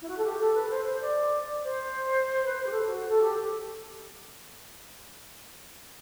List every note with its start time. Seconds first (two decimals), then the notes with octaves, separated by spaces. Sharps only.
0.01 E4
0.08 F#4
0.17 A4
0.24 G4
0.39 A4
0.55 B4
0.70 C5
0.85 C5
1.01 D5
1.63 C5
2.45 B4
2.55 C5
2.66 G4
2.71 A4
2.86 F#4
3.08 A4
3.21 G4